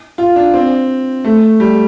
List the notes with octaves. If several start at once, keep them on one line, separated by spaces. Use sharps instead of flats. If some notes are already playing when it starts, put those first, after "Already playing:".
F4
D4
C4
A3
G3